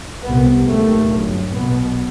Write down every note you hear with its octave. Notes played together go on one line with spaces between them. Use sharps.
C2 C3 B3
D#2 A3
G1 F#2
B1 B2 B3